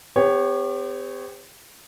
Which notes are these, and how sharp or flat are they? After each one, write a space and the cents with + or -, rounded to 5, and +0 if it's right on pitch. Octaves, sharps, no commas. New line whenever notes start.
C4 -45 G4 +35 C#5 +0